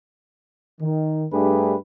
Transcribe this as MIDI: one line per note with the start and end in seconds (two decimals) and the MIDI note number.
0.81 1.25 51
1.33 1.75 43
1.33 1.75 57
1.33 1.75 62
1.33 1.75 67
1.33 1.75 68
1.33 1.75 71